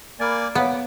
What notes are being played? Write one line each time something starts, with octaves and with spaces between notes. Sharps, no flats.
A#3 D5 G#5 B5 F6 A6
B3 C#5 F5 F#5 D6